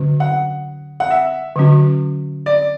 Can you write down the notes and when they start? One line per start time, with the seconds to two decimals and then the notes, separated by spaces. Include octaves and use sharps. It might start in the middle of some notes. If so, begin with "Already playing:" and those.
Already playing: D3 F#3 C#4 F#4
0.20 F#5
1.00 F#5
1.10 E5
1.56 D3 F#3 C#4 F#4
2.46 D5